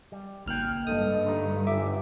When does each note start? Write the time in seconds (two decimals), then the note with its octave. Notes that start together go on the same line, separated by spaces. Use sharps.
0.12 G3
0.46 G#1 C#2 A#3 G5 F6 F#6
0.87 G2 A4 D#5 D#6
1.24 D3 A3 D#4
1.67 G1 E5 D6